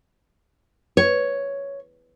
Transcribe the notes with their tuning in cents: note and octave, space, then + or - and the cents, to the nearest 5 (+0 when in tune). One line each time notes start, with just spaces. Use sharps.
C#5 +5